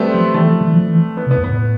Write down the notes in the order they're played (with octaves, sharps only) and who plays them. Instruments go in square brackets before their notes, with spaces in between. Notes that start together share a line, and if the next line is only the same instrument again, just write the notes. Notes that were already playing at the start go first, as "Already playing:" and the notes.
Already playing: [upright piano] G3 A3 B3 C4
[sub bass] F3
[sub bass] E3 [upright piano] A3
[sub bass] F3
E3
F3
E3
[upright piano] B3
[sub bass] C3
[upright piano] B3
[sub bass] F2
[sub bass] A2 [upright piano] B3